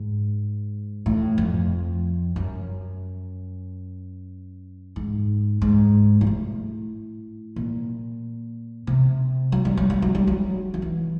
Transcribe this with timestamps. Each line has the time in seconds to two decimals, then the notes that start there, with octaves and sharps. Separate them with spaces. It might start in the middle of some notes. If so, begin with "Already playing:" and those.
Already playing: G#2
1.06 A2
1.38 F2
2.36 F#2
4.96 G#2
5.62 G#2
6.21 A#2
6.27 A2
7.56 A#2
8.87 C3
9.52 F#3
9.65 G3
9.77 F#3
9.90 G3
10.02 F#3
10.15 G3
10.27 F#3
10.74 D#3
10.82 E3